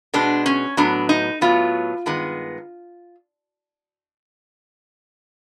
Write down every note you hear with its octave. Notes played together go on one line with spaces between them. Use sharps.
B2 G#3 B3 D4
C#4
A2 F#3 B3 D4
D#4
A2 F#3 B3 F4
G2 D#3 G#3 B3